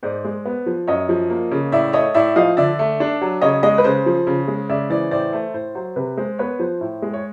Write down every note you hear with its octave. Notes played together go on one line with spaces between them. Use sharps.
G#2 C5 D5
G#3
B3
F3
F#2 C#5 D#5
F3
A#3
C#3
A2 D5 E5
A3 C#5 D#5
A2 D5 E5
F3 D#5 F5
D3 D5 E5
A3
D4
F#3
C#3 C#5 D#5
G#3 C#5 D#5
B4
C#3 C5
F3
C#3
G#3
C#3 D5 E5
E3 C5 D5
A2 C5 D5
A3 C5
A2 C5
F#3 C5
C3 B4
G#3 C5
B3 B4 C#5
F3 C5
A2
G#3
C#5